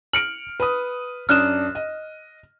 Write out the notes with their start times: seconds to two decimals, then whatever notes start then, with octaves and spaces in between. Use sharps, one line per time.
0.13 F6 C#7 D7 F#7
0.60 B4 D#6
1.29 F#2 D4 D#6 F6 F#6 E7
1.75 D#5